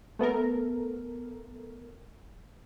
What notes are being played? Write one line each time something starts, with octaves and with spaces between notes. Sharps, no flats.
A3 B3 A4 A#4